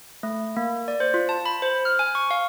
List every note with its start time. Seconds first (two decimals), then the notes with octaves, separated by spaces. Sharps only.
0.23 A3
0.57 A#3
0.88 D5
1.00 C5
1.14 F4
1.29 A5
1.46 B5
1.62 C5
1.85 F6
1.99 G#5
2.15 C#6
2.31 F5